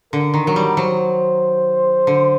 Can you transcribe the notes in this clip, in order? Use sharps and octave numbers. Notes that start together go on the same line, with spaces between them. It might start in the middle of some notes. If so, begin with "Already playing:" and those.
D3 A#4
D#3
F#3 A#4
G3
F#3 C5
D3